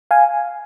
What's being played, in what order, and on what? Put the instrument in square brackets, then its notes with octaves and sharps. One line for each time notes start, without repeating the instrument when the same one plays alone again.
[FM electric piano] F5 G#5